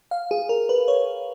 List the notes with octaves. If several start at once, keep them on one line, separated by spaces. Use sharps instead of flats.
F5
G#4
A#4
B4
C#5